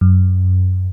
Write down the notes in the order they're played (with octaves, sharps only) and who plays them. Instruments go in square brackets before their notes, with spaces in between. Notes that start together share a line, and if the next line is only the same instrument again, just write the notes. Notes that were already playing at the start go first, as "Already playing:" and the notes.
[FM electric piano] F#2